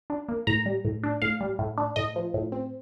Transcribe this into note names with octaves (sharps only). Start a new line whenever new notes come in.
D4
A#3
A2 A#5
G3
A2
D4
A2 F5
G3
A2
D4
A2 D#5
F3
A2
C4